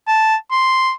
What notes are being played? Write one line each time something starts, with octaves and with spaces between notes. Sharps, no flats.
A5
C6